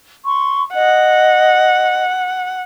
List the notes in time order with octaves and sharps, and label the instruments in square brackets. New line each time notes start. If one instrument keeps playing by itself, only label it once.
[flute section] C6 C#6
[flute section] D#5 [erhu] F#5